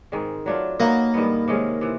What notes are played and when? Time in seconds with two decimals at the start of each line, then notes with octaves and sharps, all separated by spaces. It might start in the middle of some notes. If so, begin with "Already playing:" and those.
0.12 G#2 D#3 G#3 C4
0.46 F#3 A3 D4 F4
0.79 F#3 A#3 B3 D#4 F#4
1.14 G2 D#3 G#3 B3
1.48 C3 D#3 G#3 C#4
1.81 C3 E3